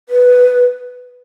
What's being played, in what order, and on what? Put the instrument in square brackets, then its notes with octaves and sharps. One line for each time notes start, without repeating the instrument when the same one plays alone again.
[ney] B4